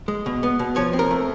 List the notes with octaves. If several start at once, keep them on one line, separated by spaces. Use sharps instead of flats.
G#3
B2
B3
B2
F3 C#5
C4
A#4
A3